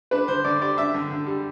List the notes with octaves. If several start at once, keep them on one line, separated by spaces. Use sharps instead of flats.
D4 B4
D3 C5
D3 D5
G3 D5
D4 E5
D3
D3
G3